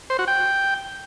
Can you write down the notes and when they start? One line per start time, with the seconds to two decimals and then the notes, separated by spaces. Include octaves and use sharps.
0.10 C5
0.19 F#4
0.28 G5